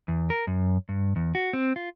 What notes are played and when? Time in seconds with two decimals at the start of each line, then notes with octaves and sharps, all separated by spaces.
0.08 E2
0.30 A#4
0.47 F#2
0.89 G2
1.16 E2
1.35 F#4
1.53 C4
1.76 F4